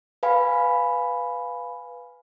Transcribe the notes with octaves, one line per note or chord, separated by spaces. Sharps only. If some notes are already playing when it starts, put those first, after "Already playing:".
B4 F5 G#5 B5